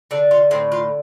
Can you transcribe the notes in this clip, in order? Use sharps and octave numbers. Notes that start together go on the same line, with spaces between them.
D3 D4
F4
A2 C4
F4